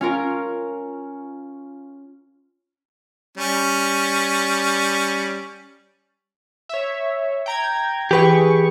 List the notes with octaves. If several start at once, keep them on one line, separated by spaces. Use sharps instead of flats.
C#4 F4 A#4
G3 C#4
C#5 E5
G5 A#5 G#6
E3 G4 G#4 B4 G5 C#6